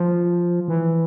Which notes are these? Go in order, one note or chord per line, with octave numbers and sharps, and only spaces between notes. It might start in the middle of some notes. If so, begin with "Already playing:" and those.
Already playing: F3
E3